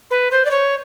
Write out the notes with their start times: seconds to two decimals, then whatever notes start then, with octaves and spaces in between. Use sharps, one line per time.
0.10 B4
0.31 C5
0.45 D5
0.50 C#5